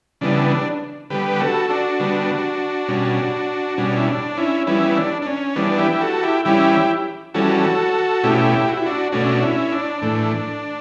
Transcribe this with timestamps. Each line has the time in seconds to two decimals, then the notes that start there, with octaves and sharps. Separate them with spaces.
0.21 C#3 E3 G3 B3 D4
1.10 D3 G3 B3 G4 B4
1.40 F#4 A4
1.70 D4 F#4
2.00 D3 G3 B3
2.88 B2 G3 C#4
3.78 B2 G3 C#4 D4
3.96 E4
4.07 D4
4.37 C#4 E4
4.67 E3 G3 B3 C#4 E4
4.97 D4
5.22 D4
5.27 C#4
5.56 E3 G3 B3 D4
5.78 E4 G4
6.01 F#4 A4
6.23 E4 G4
6.45 E3 G3 C#4 E4 G4
7.34 E3 G3 C#4 F#4 A4
8.23 B2 A3 C#4 E4 G4
8.68 F#4
8.77 E4
8.86 D4 F#4
9.12 B2 A3 C#4 D4 F#4
9.42 C#4 E4
9.72 D4
10.02 A2 E3 A3